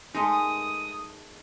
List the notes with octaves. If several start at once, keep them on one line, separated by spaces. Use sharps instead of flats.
G#3 A3 D#4 A#4 D#6